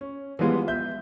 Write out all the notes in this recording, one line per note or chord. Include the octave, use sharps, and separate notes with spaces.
C#4
E3 F3 G3 G#3 B3 F4
E5 G6